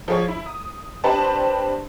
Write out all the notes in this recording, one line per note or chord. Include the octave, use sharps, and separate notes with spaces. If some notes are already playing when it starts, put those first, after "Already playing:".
F3 F4 G#4 C#5
E4
D#6
C4 D4 G4 B4 C5 A5